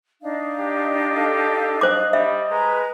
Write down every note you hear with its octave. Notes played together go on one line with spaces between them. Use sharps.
D4 D#4 F5
G4
A4
C5 D#5 D6
G3 E5
G#3 B4 A#5